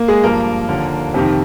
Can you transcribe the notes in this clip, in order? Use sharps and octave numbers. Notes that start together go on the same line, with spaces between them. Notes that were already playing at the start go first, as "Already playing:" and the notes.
Already playing: A#3
G#3 G#4
G2 F3 A#3 A#4
D#2 D3 F3
F2 C3 D#3